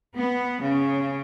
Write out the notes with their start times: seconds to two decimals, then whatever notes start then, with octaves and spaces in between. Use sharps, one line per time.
0.16 B3
0.62 C#3